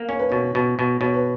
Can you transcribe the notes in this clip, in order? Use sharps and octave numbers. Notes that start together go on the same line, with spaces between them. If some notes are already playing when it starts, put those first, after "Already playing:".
Already playing: A#3
C#4 C#5
B4
B2 C#5
B2
B2
B2 C#5
B4